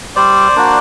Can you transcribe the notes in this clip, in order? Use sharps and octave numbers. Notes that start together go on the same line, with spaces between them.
G3 C5 D5
A#3 D4 F#4